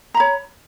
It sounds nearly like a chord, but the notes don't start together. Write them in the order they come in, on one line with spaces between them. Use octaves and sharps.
A#5 B5 C#5